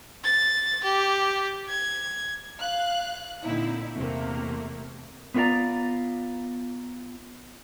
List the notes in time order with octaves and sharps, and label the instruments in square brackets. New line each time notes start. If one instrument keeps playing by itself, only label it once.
[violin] A6
G4
G#6
[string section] F5 F#6
A#2 D3 C4 D#4 E4
E2 C3 A3 A#3
[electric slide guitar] B3 C#4 F4 B4 D5 A#5